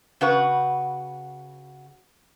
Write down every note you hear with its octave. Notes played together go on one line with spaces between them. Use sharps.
C#3 F#4 B4